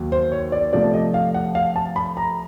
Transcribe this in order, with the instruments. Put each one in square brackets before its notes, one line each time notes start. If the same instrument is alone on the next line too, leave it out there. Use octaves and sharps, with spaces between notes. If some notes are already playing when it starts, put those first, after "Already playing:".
Already playing: [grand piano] D#2 F#3
C5
C#5
D5
C3 F3 A3 D5
D#5
F5
F#5
F5
A5
B5
A#5